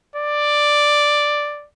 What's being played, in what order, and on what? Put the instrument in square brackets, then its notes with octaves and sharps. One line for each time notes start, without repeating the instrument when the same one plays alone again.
[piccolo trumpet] D5